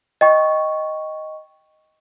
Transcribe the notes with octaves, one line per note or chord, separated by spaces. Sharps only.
D#5 G5 C#6